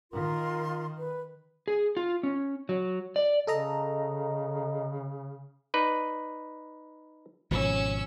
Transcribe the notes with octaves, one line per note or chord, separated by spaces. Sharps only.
D#3 F4 A#4 C6
B4
G#4
F4
C#4
F#3
D5
C#3 A4 D#5 A#5
D#4 B4 D5
G#1 B2 F3 C#4 E6